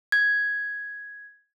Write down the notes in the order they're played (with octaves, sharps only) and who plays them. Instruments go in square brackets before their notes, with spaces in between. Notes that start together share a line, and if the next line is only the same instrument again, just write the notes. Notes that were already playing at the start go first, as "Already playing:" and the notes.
[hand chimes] G#6